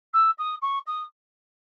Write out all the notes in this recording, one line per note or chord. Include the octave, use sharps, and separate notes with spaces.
E6
D#6
C#6
D#6